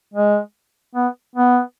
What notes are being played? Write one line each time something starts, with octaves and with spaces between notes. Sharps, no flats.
G#3
B3
B3